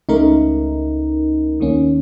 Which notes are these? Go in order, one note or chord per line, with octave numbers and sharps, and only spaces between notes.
C#2 C#3 A3 D#4 A#4
D#2 D#3 A#3 C#4